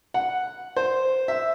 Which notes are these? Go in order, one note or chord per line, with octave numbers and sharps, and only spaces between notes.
F#5
C5
E5